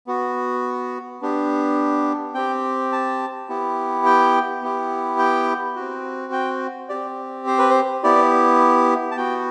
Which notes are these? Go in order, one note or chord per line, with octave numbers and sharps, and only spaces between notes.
B3 F#4
B3 D4 G4
C4 G4 G5
A5
B3 E4 G4
G5
B3 E4 G4
G5
C4 F#4
G5
C4 G4 D5
C5
B4
C5
B3 E4 G4 D5
A5
B3 F#4 G5